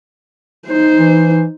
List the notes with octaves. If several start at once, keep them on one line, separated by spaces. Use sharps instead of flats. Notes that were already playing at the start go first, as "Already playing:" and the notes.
D#4 C5
E3